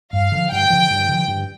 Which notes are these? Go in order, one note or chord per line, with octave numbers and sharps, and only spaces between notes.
G2 F5
D3 F3
G2 G5
D3 F3
G2
D3 F3
G2